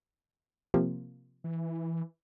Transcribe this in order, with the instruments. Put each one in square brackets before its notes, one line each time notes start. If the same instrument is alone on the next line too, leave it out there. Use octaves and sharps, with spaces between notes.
[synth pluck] C3 F3 A#3
[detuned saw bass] E3